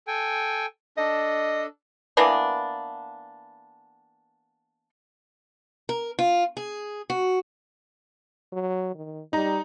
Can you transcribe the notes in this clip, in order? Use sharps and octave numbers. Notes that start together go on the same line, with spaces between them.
A4 G5 G#5
D4 A4 D#5
E3 A#3 B3 D4
A#4
F4
G#4
F#4
F#3
D#3
G3 D#4 A#5